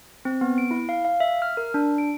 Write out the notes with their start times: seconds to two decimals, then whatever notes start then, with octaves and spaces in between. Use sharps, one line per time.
0.25 C4
0.41 B3
0.58 D7
0.71 E4
0.89 F5
1.05 F5
1.20 E5
1.42 F6
1.57 A#4
1.74 D4
1.98 D7